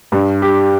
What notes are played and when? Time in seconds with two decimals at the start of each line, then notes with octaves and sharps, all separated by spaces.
0.12 G2
0.42 G4